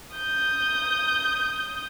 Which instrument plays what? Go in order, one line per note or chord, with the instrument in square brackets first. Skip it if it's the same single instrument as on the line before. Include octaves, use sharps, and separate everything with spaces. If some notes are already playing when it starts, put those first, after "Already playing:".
[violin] D#6 G6